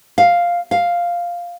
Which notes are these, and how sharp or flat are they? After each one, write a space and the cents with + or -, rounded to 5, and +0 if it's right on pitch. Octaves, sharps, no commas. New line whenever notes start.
F5 +0
F5 +0